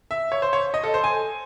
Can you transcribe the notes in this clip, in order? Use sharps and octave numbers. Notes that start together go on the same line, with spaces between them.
E5
C#5
C5
C#5
D#5
A4
C5
G#5